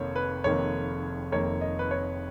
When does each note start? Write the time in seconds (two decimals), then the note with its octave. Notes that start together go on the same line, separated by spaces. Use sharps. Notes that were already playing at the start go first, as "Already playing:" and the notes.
Already playing: F1 F2 D#3 A#3 C#5
0.16 B4
0.44 F1 F2 D#3 A#3 C#5
1.32 F1 F2 D#3 A#3 C#5
1.61 D#5
1.79 B4
1.91 C#5